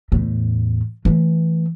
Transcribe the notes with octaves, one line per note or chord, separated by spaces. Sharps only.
E2 A2
E3 A3